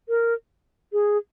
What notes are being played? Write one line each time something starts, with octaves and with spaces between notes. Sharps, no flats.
A#4
G#4